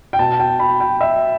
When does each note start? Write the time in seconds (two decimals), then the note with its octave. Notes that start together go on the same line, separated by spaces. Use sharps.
0.13 G5
0.19 B2 A5
0.40 G5
0.60 B5
0.80 G5
1.01 E5